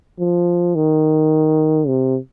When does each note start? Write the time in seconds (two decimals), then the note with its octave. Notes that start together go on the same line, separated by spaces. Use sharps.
0.20 F3
0.75 D#3
1.88 C3